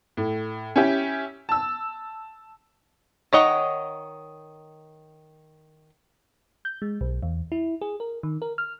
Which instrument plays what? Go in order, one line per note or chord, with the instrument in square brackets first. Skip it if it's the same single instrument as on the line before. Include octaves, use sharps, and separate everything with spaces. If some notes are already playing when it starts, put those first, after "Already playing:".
[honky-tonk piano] A2
C#4 E4 G4
A5 E6
[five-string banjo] D#3 C#5 D#5 F#5
[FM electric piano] G6
G#3
B1
E2
E4
G#4
A#4
D#3
A#4
F6